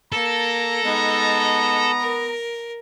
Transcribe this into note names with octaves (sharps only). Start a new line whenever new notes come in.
A#3 A4 A#5
G#3 B3 D#4
A#4